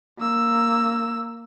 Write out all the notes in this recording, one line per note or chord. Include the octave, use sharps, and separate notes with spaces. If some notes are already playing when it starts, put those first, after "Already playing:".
A#3 E6